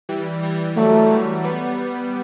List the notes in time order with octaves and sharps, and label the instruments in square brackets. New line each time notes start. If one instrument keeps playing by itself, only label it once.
[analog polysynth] E3 G3
E3 G3
[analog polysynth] F#3 [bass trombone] A3
[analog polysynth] E3 G3
G3 B3